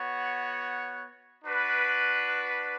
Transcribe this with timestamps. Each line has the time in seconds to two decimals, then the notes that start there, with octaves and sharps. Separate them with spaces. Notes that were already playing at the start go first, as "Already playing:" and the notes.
Already playing: B3 F#4 C#5 F#5
1.43 D4 F#4 B4